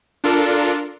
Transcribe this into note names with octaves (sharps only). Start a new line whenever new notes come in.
D4 F4 A4 A#4